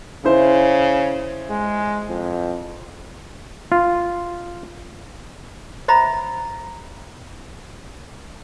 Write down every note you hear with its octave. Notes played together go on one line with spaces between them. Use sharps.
C#3 E4 C5
G#3
F2
F4
C5 D#5 E5 A#5 B5